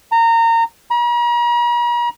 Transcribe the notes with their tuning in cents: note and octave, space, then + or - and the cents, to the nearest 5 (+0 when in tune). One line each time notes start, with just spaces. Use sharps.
A#5 -25
A#5 +45